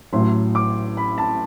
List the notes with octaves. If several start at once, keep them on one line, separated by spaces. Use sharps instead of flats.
A1 A2 F#3 C6
D6
B5
A5